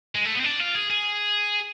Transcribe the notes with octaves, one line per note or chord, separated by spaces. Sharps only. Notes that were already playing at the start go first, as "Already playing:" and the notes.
G#3
A3
B3
C4
D4
F4
G#4
G#4